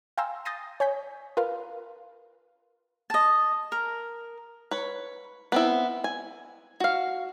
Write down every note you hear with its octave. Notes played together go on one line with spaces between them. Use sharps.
F5 G5 G#5 A#5 C6 E6
D#6 G6 A6 A#6 C7 D#7
C#5 G#5 G6 B6
F4 A#4 B4 F5
D#5 A5
A#4
B4 C#5
B3 C4 E4
G#5
F#4 F5